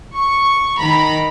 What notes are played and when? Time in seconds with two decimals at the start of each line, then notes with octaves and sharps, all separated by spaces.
0.16 C#6
0.78 D#3 A#5 B5